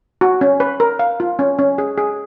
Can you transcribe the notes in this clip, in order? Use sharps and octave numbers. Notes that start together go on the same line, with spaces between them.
F#4
C#4
B4
A#4
F5
F4
C#4
C#4
G#4
G#4